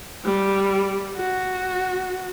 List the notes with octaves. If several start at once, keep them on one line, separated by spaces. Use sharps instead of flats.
G3
F#4